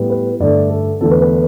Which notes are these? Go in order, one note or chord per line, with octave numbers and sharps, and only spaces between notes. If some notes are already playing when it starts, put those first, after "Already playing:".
Already playing: A2 G3 B3
B4
G2 D3 A3 D5
A4
E2 D3 A3 A4
B4
B4